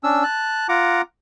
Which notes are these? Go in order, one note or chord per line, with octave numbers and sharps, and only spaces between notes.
C#4 D4 E6
A5 F#6
F4 F#5 A#5 D6